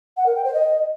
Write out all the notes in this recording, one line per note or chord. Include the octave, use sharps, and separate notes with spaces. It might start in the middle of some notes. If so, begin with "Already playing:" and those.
F#5
A#4
G5
C5
D#5